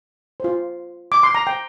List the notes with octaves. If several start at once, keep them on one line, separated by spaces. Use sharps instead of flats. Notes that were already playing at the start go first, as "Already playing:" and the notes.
F4 C5
D6
C6
A#5
G5